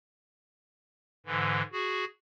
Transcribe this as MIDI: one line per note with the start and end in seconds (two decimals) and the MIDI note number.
1.26 1.62 44
1.26 1.62 50
1.26 1.62 52
1.72 2.05 66
1.72 2.05 68